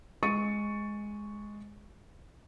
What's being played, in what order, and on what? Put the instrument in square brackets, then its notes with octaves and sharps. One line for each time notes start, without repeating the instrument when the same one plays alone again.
[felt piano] G#3 C#6 A6 C#7 D#7